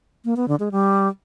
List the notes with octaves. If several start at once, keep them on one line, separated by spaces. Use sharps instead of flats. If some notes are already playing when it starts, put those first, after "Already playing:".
A#3
B3
D3
G#3
G3